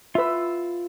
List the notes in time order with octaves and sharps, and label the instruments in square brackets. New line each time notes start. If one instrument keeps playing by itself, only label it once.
[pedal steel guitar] F4 E6 [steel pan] B4 E5